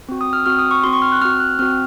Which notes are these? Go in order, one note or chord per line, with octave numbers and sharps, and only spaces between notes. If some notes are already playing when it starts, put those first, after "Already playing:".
C4 F#4
D#6
F6
C4 F#4 F6
D#6
C#6
C4 F#4 C6
C#6
F6
F#6
C4 F#4 F6
F#6
C4 F#4 F6